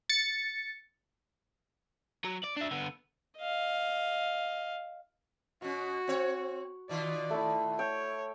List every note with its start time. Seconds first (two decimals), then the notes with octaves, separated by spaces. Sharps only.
0.09 A6 C#7
2.25 F#3
2.44 D5
2.57 D4 E5
2.71 D3 B3
3.38 D#5 F5
5.62 B2 C#4 F#4
6.08 C4 C#5
6.89 B2 D#3 F4 D5
7.30 A3 E4
7.79 C#5 G5